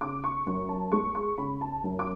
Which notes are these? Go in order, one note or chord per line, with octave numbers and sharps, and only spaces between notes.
C#3 D6
C#6
F#2 C#6
A5
G#3 C#6
C#6
C#3 B5
A5
F#2
D6